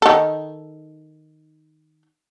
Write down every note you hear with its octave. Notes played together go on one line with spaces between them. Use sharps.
D#3 A4